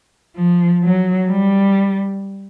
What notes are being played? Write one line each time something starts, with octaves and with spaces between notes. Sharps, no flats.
F3
F#3
G3